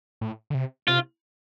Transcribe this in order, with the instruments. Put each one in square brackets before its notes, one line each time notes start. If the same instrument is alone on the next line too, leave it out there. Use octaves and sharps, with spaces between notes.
[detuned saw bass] A2
D3
C3
[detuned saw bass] C3 [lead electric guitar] F4